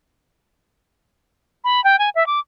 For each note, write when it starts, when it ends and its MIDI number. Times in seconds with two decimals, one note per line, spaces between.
1.64 1.83 83
1.84 1.99 79
1.99 2.10 80
2.15 2.26 76
2.27 2.40 86